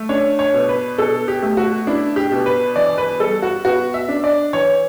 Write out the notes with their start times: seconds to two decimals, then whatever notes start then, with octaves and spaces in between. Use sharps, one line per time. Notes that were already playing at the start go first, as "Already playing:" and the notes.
Already playing: A3
0.09 D4 C#5
0.39 C#5
0.54 B2
0.69 B4
0.98 B2 A4
1.28 G4
1.42 A3
1.57 F#4
1.87 D4 E4
2.16 G4
2.32 B2
2.46 B4
2.76 E3 D5
2.98 B4
3.20 G3 A4
3.42 F#4
3.65 B3 F#4
3.94 E5
4.09 D4
4.24 D5
4.53 E3 C#5